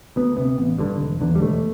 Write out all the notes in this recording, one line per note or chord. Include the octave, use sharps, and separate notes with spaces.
D2 B3
C3 B3
A1
G2 D3
E1
E2 D3
G3
E1 A3